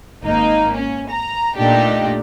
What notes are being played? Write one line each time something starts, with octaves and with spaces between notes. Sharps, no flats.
G#1 A#3 D#4
C#4
A#5
A#2 A3 D4 D#4 G4